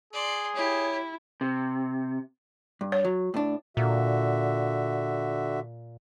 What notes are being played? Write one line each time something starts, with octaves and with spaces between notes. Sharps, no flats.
G#4 D5 C6
E4 G4 C#5
C3
G2
C#5
F#3
A2 D4
A#2 D3 F#4 E5